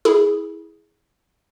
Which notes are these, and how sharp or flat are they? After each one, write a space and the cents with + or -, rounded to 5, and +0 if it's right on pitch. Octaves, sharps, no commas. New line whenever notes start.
E4 -15 G#4 +0